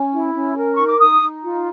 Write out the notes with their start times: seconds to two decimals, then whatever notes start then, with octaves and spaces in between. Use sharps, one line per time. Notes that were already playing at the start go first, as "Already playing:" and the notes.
Already playing: C#4
0.12 E4
0.34 C#4
0.56 A#4
0.75 D#4 C#6
0.87 D6
0.99 D#4 D#6
1.21 D#4
1.43 F4